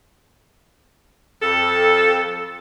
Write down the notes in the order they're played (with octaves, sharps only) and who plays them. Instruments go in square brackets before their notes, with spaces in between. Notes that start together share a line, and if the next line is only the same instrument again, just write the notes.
[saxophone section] F2 A4